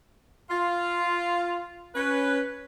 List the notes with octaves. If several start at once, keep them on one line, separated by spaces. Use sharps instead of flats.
F4
C#4 B4